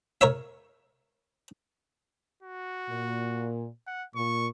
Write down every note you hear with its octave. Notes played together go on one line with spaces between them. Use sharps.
A#4 C#5 E5
F#4
A#2
F#5
A#2 C#6